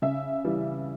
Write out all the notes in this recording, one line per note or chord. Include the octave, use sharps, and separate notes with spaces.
C#3 E5
E3 G3